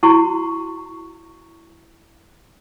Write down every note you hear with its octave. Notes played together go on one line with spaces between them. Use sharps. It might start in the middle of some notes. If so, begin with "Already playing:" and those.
E4 F#4 A#5 C#6